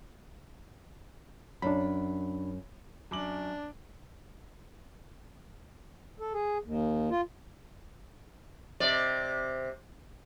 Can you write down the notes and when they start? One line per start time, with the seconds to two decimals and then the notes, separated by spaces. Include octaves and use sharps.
1.62 F#2 D4 B5
3.11 F#2 D4 D6 F#7
6.20 A4
6.33 G#4
6.64 D#2
7.11 F4
8.80 C3 D5